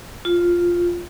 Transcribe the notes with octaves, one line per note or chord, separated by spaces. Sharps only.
F4